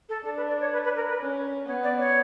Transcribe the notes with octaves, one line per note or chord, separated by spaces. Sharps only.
A4
D4 A4
B4
D5
C#5
B4
B4
A#4
B4
C#4
B3 C#5
D5
C#5